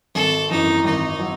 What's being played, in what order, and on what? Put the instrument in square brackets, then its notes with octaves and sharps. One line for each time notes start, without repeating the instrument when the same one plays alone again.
[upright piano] G#1 [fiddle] A4
[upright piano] F#2 E3 [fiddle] D#4
[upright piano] G#1 [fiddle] D#4
[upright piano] F#3